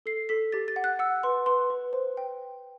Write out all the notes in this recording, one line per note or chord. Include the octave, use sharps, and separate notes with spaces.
A4 C7
A4 B6
G4 A6
A6
F#5
F#6
F#5 E6
B4 C6
B4 C6
B4
C5
G5